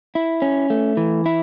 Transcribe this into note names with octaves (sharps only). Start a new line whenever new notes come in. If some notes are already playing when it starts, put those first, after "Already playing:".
E4
C#4
A3
E3
E4